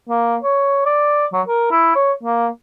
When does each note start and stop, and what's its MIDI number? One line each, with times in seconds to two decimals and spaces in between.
0.09 0.36 58
0.42 0.82 73
0.86 1.25 74
1.33 1.42 54
1.48 1.69 70
1.71 1.93 64
1.95 2.12 73
2.23 2.48 58